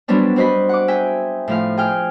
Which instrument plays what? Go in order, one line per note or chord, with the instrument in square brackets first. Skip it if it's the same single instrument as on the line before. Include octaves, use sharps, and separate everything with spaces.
[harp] F#3 G3 B3 C4 D4 B4
C4 F#4 C5 D#5 B5
F#5 D6
G#4 E5 G5
A2 F3 F5
G#4 G5 F6